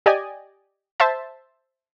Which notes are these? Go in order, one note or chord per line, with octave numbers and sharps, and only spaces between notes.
G4 D5 D#5 G#5
C5 E5 A5